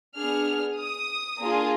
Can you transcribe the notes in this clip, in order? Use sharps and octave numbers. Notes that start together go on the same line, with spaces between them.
B3 D4 G#4 F6
D#6
A#3 D4 F4 G#4